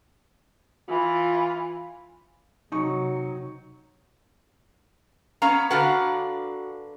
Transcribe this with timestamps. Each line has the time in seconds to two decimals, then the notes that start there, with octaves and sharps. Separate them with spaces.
0.89 E3 F4
2.72 C3 F#3 D#4 C#6
5.42 B3 C#4 F5 A#5
5.70 D3 D4 F#4 B4 F5 A#5